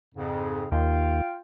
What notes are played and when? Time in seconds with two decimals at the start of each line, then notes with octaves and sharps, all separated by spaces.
0.15 F2 G#2 C#3
0.72 D#2 F4 F5 G5